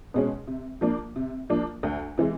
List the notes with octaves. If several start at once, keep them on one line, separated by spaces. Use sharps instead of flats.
B2 G#3 C#4
C3
F3 A#3 D4
C3
F3 A#3 D4
D2
C3 E3 G#3